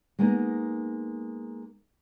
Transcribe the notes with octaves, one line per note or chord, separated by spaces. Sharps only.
G#3 A#3 B3 D#4